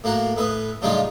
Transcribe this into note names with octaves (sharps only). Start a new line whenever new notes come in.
A2 A#3 F#4 F#5 A#5
A2 B4 E5 D#6
A2 C#3 G3 D4 D#4 F4